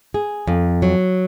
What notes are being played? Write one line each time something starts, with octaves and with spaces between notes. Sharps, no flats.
G#4
F2
F#3